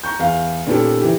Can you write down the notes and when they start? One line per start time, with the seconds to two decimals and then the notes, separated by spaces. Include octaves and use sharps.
0.04 A#5 C#6 G6
0.19 E2 F5
0.67 A#2 D#3 B3 C#4 G4 A4
1.01 E3 G4